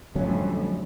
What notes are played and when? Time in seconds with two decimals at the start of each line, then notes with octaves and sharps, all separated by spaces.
0.15 F2 A2 D3 F#3 G3 C#4